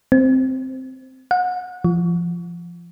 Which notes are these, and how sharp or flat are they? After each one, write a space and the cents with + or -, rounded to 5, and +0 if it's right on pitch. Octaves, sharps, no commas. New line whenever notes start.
C4 -5
F#5 -30
F3 -20